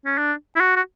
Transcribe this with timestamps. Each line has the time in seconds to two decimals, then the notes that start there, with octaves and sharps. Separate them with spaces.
0.05 C#4
0.18 D4
0.56 E4
0.60 F#4
0.76 F#4